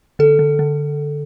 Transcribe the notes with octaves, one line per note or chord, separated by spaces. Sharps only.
D3 A4
D3
D3